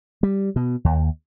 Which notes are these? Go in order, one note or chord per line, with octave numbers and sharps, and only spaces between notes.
G3
B2
D#2